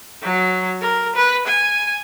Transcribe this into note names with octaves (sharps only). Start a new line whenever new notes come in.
F#3
A#4
B4
G#5